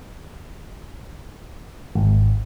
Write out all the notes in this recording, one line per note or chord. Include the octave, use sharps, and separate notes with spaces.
G#1